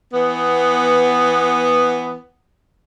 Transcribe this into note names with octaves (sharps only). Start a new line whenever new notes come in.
E3 B3